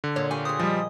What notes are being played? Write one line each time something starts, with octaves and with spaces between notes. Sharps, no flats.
D3
A#2 C#5
G4 C#5 F5 G#5
G#4 C5 D#6
F3 G3 D#5